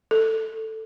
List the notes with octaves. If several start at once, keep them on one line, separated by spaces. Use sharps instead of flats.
A4